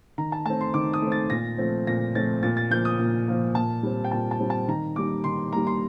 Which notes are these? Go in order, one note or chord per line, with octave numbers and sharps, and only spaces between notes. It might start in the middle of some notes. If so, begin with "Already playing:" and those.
D#3 A#5
A5
A3 C4 A5
C6
D#3 D6
D#6
A3 C4
A6
A#2 A#6
F3 A3 C4
A#2 A#6
F3 A3 C4 A6
A#2 A6
A6
F3 A#3 G6
D#6
A#2
F3 A#3
A#2 A5
G3 C4
G5
A#2 A5
A5
G3 C4
A5
D#3 A#5
G3 A#3 D6
D#3 C6
G3 A#3 A#5
C6